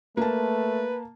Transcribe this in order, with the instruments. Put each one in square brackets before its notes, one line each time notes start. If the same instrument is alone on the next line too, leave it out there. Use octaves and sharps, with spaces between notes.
[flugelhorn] A3 [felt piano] A#3 A5 [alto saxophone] B4